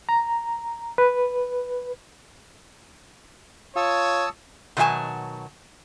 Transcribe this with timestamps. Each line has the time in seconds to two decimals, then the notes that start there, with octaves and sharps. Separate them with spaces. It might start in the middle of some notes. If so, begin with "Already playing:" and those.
0.09 A#5
0.98 B4
3.76 F4 C#5 A5 D#6 E6
4.77 B2 D#3 F#3 E5 G#5 A5